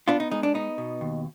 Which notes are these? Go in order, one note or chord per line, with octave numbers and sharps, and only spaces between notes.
B3 D4 F4
D#4
G#3 D#4
D4
B3 D#4
B2
D#2